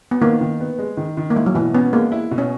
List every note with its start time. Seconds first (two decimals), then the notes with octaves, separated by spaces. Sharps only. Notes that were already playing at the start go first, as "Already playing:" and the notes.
0.11 B3
0.21 D#3 A#3
0.41 D#3
0.60 B3
0.79 G#3
0.97 D#3
1.17 D#3
1.30 A#3
1.35 G#3 E4
1.46 F#3
1.54 B2 E3
1.74 B3 C#4
1.92 G#3 A#3
2.12 E4
2.31 B2
2.38 C#4